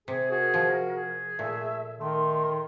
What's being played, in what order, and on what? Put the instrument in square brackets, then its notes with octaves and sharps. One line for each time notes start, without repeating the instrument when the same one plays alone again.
[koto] C3 [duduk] G#4
[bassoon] F#4 [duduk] G#4 [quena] A#4
[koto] F3
[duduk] G#4
[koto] A#2 [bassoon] A3 [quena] E5
[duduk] D#3 [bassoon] A3 [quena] C6